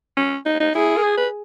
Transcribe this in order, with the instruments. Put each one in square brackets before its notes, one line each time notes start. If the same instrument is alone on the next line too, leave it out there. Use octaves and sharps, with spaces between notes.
[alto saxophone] C#4
D#4
D#4
[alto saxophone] E4 [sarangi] G#4
[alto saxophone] A#4
G#4
B4